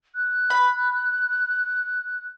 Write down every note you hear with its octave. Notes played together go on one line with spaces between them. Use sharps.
F#6
B5